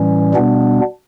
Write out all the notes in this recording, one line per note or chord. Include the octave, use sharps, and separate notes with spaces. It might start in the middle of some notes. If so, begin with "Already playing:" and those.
Already playing: A2 E3 G3 C#4
B2 G3 B3 D4